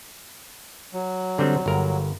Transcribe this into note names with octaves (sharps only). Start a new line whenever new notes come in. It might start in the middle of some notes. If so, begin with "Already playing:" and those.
F#3
D3 G3 C4
G1 A#4